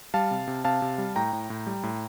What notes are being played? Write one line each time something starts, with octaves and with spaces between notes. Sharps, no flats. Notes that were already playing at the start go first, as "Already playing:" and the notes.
G3 F5 A5
C3
C3
C3 F5 A5
C3
G3
A2 G5 A#5
A2
A2
G3
A2